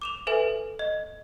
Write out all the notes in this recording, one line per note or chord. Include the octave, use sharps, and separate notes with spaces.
D6 E7 F7
A4 B4 E5 G#5
D#5